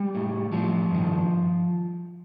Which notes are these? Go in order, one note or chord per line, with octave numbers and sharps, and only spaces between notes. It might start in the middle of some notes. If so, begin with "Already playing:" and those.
Already playing: G3
A2
A2 F3
G2 D#3